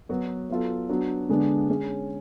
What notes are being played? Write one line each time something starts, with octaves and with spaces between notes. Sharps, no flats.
F#3 B3 F#4 B4
F#3 B3 F4 A4
F#3 B3 D4 F#4
D3 G#3 B3 D4
G#3 C#4 G#4 C#5